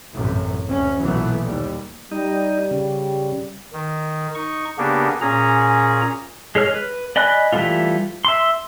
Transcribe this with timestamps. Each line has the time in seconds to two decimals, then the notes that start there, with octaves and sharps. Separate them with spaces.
0.14 A1 F#2 A2 C3
0.68 D2 C#4
1.00 B1 A#2 E3 F#3 A3 B3
1.44 D#2 G3
2.12 G3 D#4
2.71 C#3
3.73 D#3
4.35 D#4 C#6
4.78 C#3 A#3 B3 D4 G4
5.21 A#2 C#4 G#4 A#5
6.55 G#3 G#4 C#5 F6
6.74 B4
7.16 D5 D#5 G#5 B5 F#6
7.52 E3 G3 A3 B3 F4
8.25 E5 C6